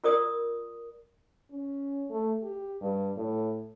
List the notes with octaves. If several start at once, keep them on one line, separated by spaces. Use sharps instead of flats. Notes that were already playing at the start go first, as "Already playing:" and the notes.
F4 A#4 D5 D#6
C#4
A3
G4
G2
A2